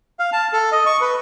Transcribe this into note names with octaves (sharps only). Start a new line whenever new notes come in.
F5
A5
A4
D#5
C#6
B4